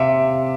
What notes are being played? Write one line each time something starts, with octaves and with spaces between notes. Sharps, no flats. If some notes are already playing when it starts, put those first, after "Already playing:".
Already playing: C3 E5 F5